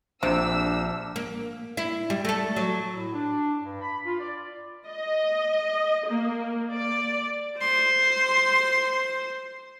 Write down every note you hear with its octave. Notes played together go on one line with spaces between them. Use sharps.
A#1 C3 D4 E6
A#3
E4
G3
A3 A4
F#3
A2
D4
G2
B5
F4
D5
D#5
A#3
D5
C5 C6